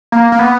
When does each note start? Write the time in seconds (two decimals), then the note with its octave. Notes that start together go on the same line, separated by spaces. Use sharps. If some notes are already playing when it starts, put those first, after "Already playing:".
0.12 A#3
0.32 A#3
0.39 B3